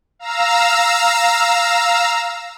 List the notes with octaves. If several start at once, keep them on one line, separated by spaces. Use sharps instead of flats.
F5 A#5 E6